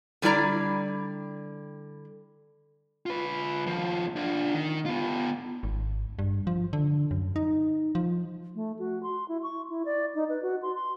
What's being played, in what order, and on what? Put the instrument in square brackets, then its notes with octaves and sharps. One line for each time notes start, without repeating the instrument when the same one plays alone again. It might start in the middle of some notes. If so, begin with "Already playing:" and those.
[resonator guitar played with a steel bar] D3 G3 E4 D5 A#5
[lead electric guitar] F4 B4
D#2 F3
D4 F4
D#3
B3 F4
[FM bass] G#1
G2
F3
D3
F#2
D#4
F3
[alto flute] A3
F#4
C6
E4
C#6
E4
D5
D#4
B4
F#4
C6
C6